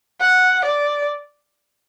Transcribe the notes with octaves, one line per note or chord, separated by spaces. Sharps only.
F#5
D5